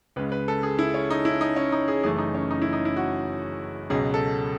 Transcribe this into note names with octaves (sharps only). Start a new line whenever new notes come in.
C#2 C#3 G#3 B4
B4
A4
G#4
E4
C#4
D#4
E4
D#4
C#4
D#4
G#4
F#1 F#2 E3 A3 G#4
D#4
C#4
D#4
E4
D#4
E4
F#4
C#2 B2 F#3 G#4
A4